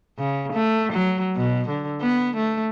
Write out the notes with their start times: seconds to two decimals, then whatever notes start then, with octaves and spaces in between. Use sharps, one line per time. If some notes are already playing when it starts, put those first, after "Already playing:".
0.19 C#3
0.53 A3
0.93 F#3
1.37 B2
1.69 D3
2.01 B3
2.36 A3